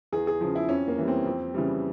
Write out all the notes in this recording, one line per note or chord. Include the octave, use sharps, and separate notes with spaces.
E2 G#4
G#4
C#3 F3
E4
F2 C#4
A#3
E3 G3
C4
F2
C#3 E3 G3